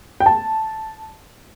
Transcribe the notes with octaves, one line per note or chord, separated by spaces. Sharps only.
G5
A5